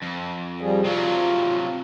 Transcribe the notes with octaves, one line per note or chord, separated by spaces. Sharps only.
F2
F3 G3 G#4
C3 F#3 F4